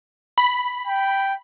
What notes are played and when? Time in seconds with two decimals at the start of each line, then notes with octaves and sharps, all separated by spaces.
0.38 B5
0.87 G5